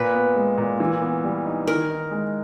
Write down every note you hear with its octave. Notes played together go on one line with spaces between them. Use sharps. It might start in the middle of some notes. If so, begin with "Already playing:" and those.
Already playing: A#2 B4
B3
G#3
A#2
E3
B3
G3
D#4
D#3 A#4
D#4
G#3